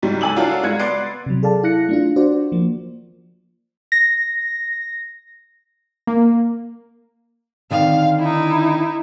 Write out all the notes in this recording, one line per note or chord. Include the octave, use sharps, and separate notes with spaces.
G#2 F#3 G3
G#2 A4 G#5 D6 E6 F#7
D4 F4 F#4 A4 A#4 C#5
G2 G#3 F#6 G#6 C#7
B3 D5 C6 F#6 C7 D7
C3 F#3
G#4 A4 D5 F5 A5
E4 F5 F#6 A#6 C#7
A3 D4 F4
D4 F#4 C5 D5
F3 A#3
A#6
A#3
D3 D#3 C4 F5
D#4 E4